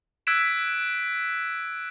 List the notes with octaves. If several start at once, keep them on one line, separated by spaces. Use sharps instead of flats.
E6 F#6 G#6 B6 D7 E7